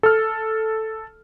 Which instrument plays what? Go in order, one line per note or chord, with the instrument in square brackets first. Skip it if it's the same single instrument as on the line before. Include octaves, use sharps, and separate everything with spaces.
[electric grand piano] A4 F6